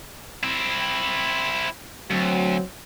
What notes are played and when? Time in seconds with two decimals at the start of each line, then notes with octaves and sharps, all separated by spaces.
0.43 C4 E4
2.11 D2 F#3 C4